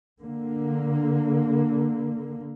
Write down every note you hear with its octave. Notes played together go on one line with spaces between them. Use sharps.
D3 A#3